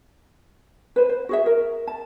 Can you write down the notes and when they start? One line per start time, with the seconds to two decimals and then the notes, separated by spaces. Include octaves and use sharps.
0.96 B4 C5
1.09 C5
1.29 F#4 G#4 E5
1.46 A#4
1.87 A5